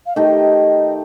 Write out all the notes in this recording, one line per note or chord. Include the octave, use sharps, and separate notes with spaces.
F5
D#3 A3 D#4 G4 D#5